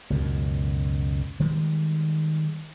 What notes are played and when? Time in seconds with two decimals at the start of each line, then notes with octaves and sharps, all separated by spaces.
0.10 C#2 F#2 B2
1.40 D#3 G3 G#3